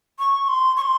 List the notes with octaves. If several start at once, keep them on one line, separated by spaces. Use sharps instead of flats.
C#6
C6
C#6
C6